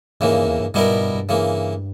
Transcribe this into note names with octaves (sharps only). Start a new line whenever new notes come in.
D#2 G#2 C#3 E3 A#3
G2
E2
G2
G2 B2 G3 B3 E4 A#4
G#2
G2
G2
C#3 E3 A#3